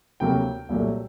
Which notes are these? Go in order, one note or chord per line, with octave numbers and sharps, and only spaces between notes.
D2 C3 F#3 A#3 G5
C2 A#2 F#3 A3